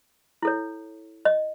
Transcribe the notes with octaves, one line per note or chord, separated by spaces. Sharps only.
E4 A4 C#5
D#5